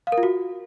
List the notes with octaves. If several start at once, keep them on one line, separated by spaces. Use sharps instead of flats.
F5
A#4
F4
F#4